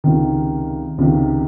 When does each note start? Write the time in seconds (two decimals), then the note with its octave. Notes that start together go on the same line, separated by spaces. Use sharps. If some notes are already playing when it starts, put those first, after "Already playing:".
0.04 C#2 C3 D#3
0.98 C#2 C3 D#3